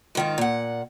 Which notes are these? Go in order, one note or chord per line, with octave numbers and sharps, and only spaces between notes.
G#2 D#3 F4
A#2 F#5